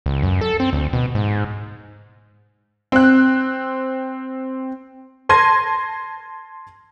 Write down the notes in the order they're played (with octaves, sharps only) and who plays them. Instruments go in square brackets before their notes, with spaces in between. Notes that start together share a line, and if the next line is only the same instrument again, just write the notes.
[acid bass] C#2
F#2
A4
C4
D2
B2
G#2
[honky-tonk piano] C4 F#6
A5 C6 G#6 A#6 D#7